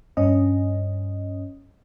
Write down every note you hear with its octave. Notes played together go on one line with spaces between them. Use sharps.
G2 C#4 D#5